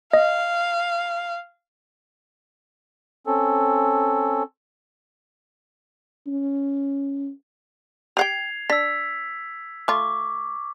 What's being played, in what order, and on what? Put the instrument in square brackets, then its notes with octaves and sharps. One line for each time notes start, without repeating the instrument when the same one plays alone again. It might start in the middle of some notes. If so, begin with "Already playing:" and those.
[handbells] D#5 [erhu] F5
[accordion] C4 C#4 A4
[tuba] C#4
[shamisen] G4 F#5 G5 [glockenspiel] G#6 C7 F7
[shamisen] D4 [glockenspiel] E6 B6
[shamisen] A3 F4 [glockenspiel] C#6 D6